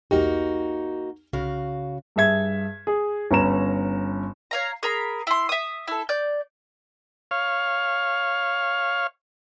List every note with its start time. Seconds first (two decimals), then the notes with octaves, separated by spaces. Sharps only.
0.11 B1 E2 A#3 D#4 F#4 G4
1.33 C2 C#3 F#4 F5
2.16 G2 G#4 E5 G#6
2.87 G#4
3.31 G1 C#4 A#5 E7
4.51 C#5 F5 A#5
4.83 G#4 A#4 A#5 B5
5.27 E4 C6
5.49 E5 D#6
5.87 E4 A4
6.09 D5 G6
7.31 C#5 F5